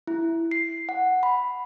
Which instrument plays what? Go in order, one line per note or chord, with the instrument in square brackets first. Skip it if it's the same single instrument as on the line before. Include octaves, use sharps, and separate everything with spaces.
[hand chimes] E4
C7
F#5
B5